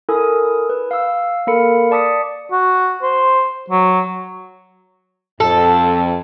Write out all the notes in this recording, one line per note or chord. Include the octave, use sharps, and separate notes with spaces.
E4 A4 A#4 G#5 D#6
B4
F5 E6
A#3 A4 A#4 F5 B5 C#7
D5 A5 D6 D#6 B6 C#7
F#4
C5
F#3
F2 A4